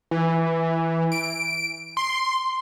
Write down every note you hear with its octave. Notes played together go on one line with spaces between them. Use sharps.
E3
D7
C6